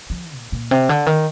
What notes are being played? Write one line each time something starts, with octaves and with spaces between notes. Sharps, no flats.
F3
A#2
A#2
C3
D3
D#3